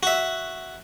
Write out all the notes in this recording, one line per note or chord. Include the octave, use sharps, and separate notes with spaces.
F#4 E5